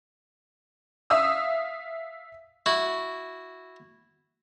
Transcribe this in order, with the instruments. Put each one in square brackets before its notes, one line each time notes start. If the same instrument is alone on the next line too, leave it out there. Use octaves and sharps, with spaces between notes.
[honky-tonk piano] E5 F5 D#6 E6
[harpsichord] E4 F#4